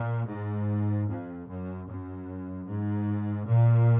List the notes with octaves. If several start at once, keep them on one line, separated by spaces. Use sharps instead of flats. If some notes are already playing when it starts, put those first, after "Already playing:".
Already playing: A#2
G#2
F2
F#2
F#2
G#2
A#2